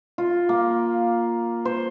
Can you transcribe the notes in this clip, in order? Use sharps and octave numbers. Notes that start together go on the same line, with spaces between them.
F4
A#3
C5